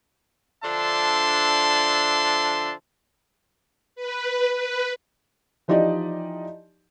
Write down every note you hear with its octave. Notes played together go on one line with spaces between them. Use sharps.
D3 F3 D4 E5 A5 C6
B4
B4
E3 F3 D#4 G4 D5 D#5